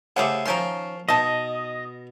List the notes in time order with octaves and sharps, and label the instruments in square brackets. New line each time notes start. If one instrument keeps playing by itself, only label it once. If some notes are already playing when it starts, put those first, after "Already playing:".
[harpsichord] C#3 A3 C5 [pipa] G4 G#4 F#5
[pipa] D#3 C#4 A#5 [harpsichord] F3 G5 C6
[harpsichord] B2 [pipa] D#4 A5 [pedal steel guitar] D#5